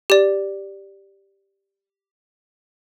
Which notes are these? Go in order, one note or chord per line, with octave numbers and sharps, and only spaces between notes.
G4 D5